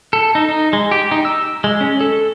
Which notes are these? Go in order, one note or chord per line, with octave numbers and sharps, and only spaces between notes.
A4
D#4
D#4
G#3
G4
D#4
E6
G#3
C#4
A4